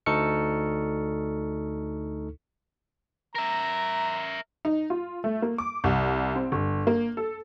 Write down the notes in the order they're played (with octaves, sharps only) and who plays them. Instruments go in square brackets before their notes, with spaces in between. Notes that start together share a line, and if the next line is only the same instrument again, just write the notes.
[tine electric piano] D2 D#4 A4 C#6 F6 C#7
[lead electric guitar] A#4 E5 [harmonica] A#5
[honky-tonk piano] D#4
F4
A3
A#3
D6
C2
C4
G1
A#3
A4